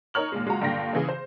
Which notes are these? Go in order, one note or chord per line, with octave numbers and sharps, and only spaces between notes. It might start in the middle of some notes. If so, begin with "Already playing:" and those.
D#4 A#4 C#5 F6 F#7
D#2 A#2 G#3
F#1 G#3 F4 F#4 F#5 A#5
G2 A#2 D3 F5 G5 A#6
C#3 E3 G#4
C5